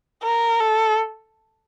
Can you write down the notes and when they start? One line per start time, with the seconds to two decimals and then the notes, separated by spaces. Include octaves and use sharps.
0.23 A#4
0.60 A4